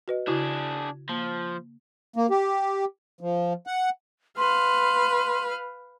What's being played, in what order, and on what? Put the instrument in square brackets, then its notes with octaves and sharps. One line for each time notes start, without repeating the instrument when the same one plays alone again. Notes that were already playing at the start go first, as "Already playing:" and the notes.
[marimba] F#4 B4 D#5
[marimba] C#3 E4 F#4 [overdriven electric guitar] D4 G#4
[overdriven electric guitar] F3 [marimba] A#3
[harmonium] A#3
G4
F3
F#5
[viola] B4 F5 [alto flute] C6